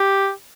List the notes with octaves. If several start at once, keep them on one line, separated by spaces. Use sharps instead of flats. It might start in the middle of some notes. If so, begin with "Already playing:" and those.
Already playing: G4